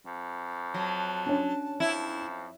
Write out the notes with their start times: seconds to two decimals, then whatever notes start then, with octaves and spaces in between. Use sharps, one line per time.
0.06 F2
0.74 F#3 A5
1.26 C#4 D4
1.80 F2 E4